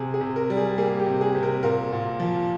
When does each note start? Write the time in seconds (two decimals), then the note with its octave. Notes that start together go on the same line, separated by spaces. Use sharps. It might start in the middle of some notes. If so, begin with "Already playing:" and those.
Already playing: C3 G#4
0.14 G#4
0.21 C3
0.36 A#4
0.50 G3
0.57 G#4
0.78 A#3 G#4
1.00 G4
1.07 C3
1.21 G#4
1.35 C3
1.43 A#4
1.63 A#2 A#4
1.92 A#2
2.20 F3